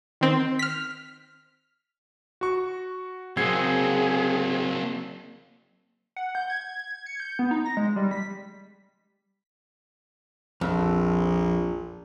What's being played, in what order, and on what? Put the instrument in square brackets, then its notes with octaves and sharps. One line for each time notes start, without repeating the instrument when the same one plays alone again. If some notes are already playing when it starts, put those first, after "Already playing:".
[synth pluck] D#3 C4
F6 B6
[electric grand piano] F#4 C#6
[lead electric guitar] F#3 A#3 [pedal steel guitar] C4 [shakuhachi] G#4 [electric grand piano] G#6 C7
[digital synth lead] F#5
G6
G#6
C#7
G6
B3
D#4
A#6
G#3
G3
B6
[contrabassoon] A#1 [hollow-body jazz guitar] F2